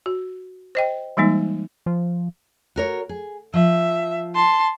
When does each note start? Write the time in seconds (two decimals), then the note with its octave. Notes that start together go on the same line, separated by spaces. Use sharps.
0.06 F#4
0.75 C5 D#5 G5
1.17 E3 G3 G#3 A#3 D#4
1.86 F3
2.76 F#4 A#4 C#5
3.09 G#4
3.54 F3 E5
4.35 A5 C6